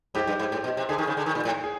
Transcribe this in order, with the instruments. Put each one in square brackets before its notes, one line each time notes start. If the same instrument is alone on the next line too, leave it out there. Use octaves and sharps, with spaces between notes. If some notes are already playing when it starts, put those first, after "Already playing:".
[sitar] G#2 [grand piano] G4
[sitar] G2
G#2
A2
B2
C3
[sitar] D3 [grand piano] G#4
[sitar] D#3
C#3
D3
D#3
A#2
A2
[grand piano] G#4